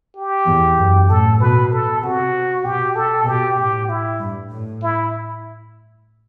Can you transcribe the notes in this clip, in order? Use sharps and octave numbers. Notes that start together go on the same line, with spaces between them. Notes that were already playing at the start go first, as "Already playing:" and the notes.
G4
E2
F#2
A2 A4
B2 B4
A4
C3 F#4
B2 G4
A4
B2 G4
A2 G4
E4
G2
A2
E4